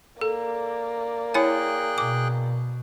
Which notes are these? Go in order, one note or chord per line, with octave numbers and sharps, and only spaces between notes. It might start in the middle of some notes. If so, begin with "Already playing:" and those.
A#3 A4 D5
E4 G#4 C#5 G5 G#5 F#6
B2 D6